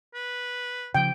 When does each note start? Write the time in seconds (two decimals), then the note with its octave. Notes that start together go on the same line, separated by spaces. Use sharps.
0.14 B4
0.95 C#3 F3 G5